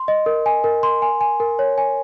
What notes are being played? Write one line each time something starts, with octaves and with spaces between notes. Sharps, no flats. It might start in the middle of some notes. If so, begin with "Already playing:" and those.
Already playing: C6
D#5
A#4
G#5
A#4
C6
G#5
G#5
A#4
C#5
G#5